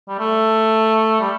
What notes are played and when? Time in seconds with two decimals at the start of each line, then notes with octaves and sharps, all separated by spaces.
0.08 G3
0.19 A3
1.20 G3